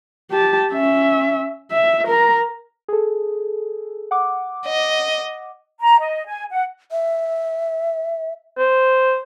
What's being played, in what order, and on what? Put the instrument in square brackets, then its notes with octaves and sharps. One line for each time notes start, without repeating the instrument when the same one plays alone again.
[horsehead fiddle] G4 A5
C#4 E5
E5
A#4 A#5
[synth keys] G#4 A4
F#5 D6
[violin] D#5
[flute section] A#5
D#5
G#5
F#5
[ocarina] E5
[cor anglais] C5